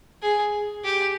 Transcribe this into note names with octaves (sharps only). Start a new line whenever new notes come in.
G#4
G4